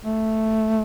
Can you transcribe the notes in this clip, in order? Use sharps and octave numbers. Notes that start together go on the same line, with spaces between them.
A3